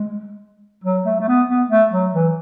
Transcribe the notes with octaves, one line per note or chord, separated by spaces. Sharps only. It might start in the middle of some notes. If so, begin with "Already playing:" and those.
Already playing: G#3
F#3
A3
A3
B3
B3
A3
F#3
E3